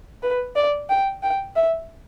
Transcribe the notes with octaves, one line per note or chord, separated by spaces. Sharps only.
B4
D5
G5
G5
E5